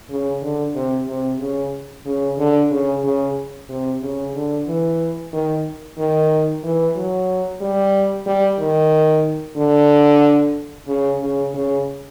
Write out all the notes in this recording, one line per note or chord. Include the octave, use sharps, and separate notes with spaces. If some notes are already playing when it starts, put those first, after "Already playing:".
C#3
D3
C3
C3
C#3
C#3
D3
C#3
C#3
C3
C#3
D3
E3
D#3
D#3
E3
F#3
G3
G3
D#3
D3
C#3
C#3
C#3